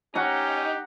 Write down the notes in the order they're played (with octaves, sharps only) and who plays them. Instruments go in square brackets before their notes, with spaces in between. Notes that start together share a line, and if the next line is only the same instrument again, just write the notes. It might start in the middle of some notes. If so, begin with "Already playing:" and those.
[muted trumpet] C#4 [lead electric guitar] D#4 [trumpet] G4 [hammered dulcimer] F#5 A#5